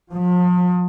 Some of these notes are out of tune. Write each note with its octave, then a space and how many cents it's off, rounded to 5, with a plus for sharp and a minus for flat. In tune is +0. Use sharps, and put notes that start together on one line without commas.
F3 +40